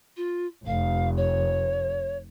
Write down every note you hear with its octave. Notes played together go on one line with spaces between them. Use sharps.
F4
F1 F5
C#5